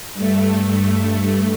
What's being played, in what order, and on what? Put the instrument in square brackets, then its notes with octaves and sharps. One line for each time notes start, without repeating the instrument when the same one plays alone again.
[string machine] G2 A3